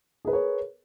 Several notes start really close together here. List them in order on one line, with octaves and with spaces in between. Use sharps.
G#4 B4 A#4 C#5